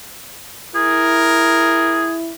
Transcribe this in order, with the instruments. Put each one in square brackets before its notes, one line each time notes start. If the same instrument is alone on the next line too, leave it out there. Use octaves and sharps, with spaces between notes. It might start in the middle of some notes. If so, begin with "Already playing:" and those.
[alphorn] E4 [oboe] G#4 [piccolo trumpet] A#4